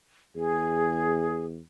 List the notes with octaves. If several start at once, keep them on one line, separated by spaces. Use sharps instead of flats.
E2 G#4